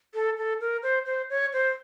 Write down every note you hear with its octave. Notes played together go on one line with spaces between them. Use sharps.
A4
A4
A#4
C5
C5
C#5
C5